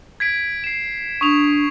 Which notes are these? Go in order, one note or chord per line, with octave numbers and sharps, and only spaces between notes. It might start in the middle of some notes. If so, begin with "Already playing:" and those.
G#6 B6 D7
C7 E7
D4 C#6 D#6 F7